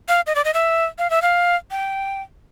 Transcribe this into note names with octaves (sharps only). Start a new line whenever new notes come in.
F5
D#5
D5
D#5
E5
F5
E5
F5
G5